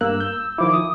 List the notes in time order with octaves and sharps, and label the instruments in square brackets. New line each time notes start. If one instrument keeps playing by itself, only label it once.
[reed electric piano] G2 A#3 F#6 [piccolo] E6
[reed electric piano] G6
[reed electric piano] D#3 F3 E4 [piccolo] D6
[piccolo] D#6